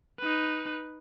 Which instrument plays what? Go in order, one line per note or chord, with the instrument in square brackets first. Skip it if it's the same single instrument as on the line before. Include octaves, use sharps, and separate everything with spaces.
[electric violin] D#4 B4